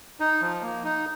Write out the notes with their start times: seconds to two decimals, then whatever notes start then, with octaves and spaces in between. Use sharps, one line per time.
0.20 D#4
0.41 F3
0.62 A#3
0.84 D#4